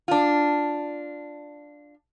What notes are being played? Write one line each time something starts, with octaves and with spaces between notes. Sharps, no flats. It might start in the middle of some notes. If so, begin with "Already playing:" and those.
D4 F4